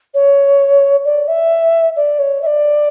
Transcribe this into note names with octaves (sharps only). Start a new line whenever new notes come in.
C#5
D5
E5
D5
C#5
E5
D5